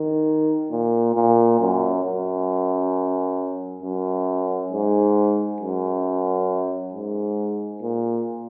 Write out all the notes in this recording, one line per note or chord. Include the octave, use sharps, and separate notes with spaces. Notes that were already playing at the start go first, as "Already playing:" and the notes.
Already playing: D#3
A#2
A#2
F#2
F#2
F#2
G#2
F#2
G#2
A#2